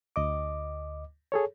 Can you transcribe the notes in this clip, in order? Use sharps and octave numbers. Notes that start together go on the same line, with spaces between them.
D2 D#5 D6
G#4 A4 C#5